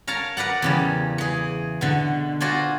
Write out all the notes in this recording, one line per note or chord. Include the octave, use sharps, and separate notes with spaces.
A#4 C#5 F5 A5 A#5
A#4 B4 D5 F#5
E2 C#3 G3
E3 G#4
B2 D3
F4 F#4 C5 D5 G#5